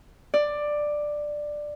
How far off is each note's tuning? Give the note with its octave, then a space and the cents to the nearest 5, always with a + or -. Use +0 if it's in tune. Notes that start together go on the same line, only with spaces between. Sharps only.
D5 +10